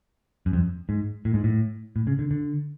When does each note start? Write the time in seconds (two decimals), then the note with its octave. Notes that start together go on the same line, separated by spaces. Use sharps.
0.46 F#2
0.53 F2
0.89 G#2
1.25 A2
1.34 G#2
1.44 A2
1.96 A2
2.07 C#3
2.19 D3
2.31 D3